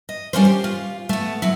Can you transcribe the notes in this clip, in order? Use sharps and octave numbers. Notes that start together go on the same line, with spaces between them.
D#5
G3 C#4 D4 F4 A#4 C5
G4
F4
A3 B3
D2 F#3 E4